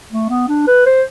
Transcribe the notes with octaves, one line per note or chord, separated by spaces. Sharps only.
A3
B3
D4
B4
C5